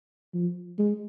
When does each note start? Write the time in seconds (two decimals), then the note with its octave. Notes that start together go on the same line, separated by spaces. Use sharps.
0.34 F3
0.79 G#3